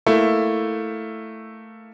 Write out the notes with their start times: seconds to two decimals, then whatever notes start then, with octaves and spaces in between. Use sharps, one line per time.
0.06 A3 A#3 E4